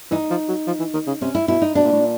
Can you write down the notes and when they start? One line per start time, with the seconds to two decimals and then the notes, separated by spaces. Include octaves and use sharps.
0.11 E3 D#4
0.30 F3
0.48 F#3
0.67 F3
0.79 E3
0.94 D#3
1.07 C#3
1.21 C3 C#4
1.35 E4
1.48 B2 E4
1.62 D#4
1.75 B2 D4
1.85 A#2
1.92 A2
2.01 A#2